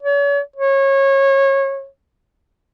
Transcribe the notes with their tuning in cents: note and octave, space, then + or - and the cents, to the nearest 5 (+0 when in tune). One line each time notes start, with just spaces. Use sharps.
C#5 +40
C#5 -25